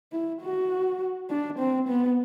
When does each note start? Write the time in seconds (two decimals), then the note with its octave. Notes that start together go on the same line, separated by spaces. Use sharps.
0.12 E4
0.42 F#4
1.30 D4
1.58 C4
1.88 B3